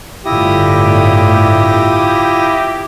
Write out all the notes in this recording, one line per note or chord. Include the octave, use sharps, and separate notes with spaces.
G1 A2 D3 E4 F4 G4 D#6 A#6